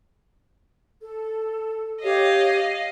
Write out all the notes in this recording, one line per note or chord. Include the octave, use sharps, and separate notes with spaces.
A4
G4 C#5 D#5 F5